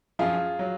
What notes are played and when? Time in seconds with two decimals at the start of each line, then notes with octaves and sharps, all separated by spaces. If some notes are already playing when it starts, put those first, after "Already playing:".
0.19 F#2 F3 F4 G#4
0.59 F#3